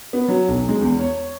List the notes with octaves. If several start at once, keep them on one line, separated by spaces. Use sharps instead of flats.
B3
F#3
B1
G#3
E2
C#5